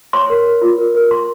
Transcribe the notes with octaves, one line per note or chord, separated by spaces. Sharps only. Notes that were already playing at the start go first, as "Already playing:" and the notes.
C#5 C6
A#4
A#4
F4
A#4
A#4
A#4 C6